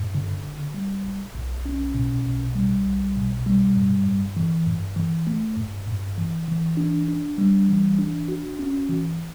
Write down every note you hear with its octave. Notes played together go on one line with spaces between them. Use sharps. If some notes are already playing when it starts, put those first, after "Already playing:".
Already playing: G2
D3
G1
G3
G1
B1
C#4
B2
B1
G3
B1
B2
G3
G2
G2
E3
G2
E3
A3
G2
G2
E3
E3
D4
D4
G3
E3
D4
F#4
C#4
E3